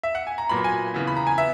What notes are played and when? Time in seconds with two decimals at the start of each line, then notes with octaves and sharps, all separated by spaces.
0.03 E5
0.15 F#5
0.27 G#5
0.38 A#5
0.49 A#2 F#3 B3 B5
0.64 G#5
0.94 C#3 E3 B3
1.07 B5
1.16 A#5
1.27 G#5
1.37 B3 E5